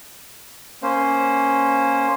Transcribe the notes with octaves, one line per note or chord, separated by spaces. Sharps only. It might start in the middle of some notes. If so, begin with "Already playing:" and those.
A#3 C#4 C5